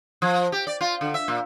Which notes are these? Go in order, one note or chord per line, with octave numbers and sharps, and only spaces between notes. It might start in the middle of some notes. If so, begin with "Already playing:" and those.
F3
G4
D5
F4
D3
E5
A#2